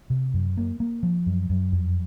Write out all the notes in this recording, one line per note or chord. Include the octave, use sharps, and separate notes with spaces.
C3
F#2
A#3
A#3
F3
F#2
F#2
F2